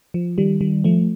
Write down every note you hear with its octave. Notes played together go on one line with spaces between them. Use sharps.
F3
D#3 G3
D#3 G3
F3 A3